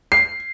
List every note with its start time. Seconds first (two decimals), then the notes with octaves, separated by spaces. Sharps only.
0.12 C7